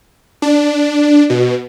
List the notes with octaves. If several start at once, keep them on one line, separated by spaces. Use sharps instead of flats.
D4
B2